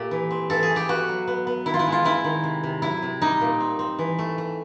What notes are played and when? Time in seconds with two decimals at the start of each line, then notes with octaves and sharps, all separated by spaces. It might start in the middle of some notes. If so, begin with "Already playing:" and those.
Already playing: A#2 A3 G4
0.11 E3
0.31 C4
0.50 E3 A4
0.63 G#4
0.70 A3
0.76 G4
0.89 B3 F#4
1.09 F#3
1.27 B3
1.47 B3
1.66 D#3 E4
1.74 F4
1.79 E4
1.86 G#3
1.92 F4
2.05 C4 E4
2.24 D#3
2.44 C3
2.63 C3
2.82 F#3 E4
3.03 C3
3.22 G3 D#4
3.41 A#2
3.60 C4
3.79 C4
3.99 E3
4.19 A3
4.38 A3